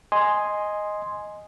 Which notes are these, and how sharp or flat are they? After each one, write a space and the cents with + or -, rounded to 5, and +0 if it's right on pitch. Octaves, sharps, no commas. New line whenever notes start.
D#5 +0 G#5 +0 C6 +0